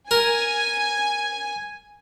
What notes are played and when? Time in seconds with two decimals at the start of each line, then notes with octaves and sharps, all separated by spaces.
0.11 A#4 G#5